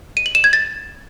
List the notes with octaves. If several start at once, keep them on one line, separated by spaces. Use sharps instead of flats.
D#7
F#7
E7
G#6
A6